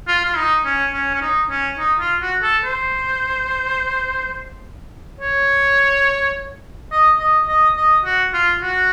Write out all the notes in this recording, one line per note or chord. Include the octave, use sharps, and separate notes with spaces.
F4
F4
D#4
C#4
C#4
C#4
D#4
C#4
D#4
F4
F#4
A4
C5
C#5
D#5
D#5
D#5
D#5
F#4
F4
F#4